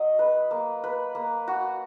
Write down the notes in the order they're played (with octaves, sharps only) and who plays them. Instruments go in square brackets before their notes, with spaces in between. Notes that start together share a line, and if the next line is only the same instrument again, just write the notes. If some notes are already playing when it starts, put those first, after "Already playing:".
Already playing: [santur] F#3 D#5
B4
A#3
B4
A#3
F#4